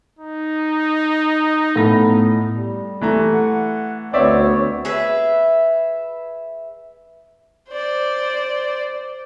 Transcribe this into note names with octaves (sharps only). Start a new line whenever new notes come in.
D#4
A2 B3 A#6
G3
E3 A3 A#5
F#5
D2 B3 C4 C#5 D5 E5
G#4 B4 E5
C5 D5